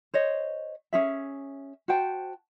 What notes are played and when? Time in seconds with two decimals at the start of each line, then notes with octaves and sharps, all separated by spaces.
0.14 C5 C#5 D#5
0.93 C#4 G#4 E5
1.88 F#4 C5 G5 A5